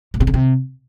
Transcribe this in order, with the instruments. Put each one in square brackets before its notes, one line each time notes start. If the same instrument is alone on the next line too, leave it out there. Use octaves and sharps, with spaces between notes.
[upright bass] A2
C3
C#3
C3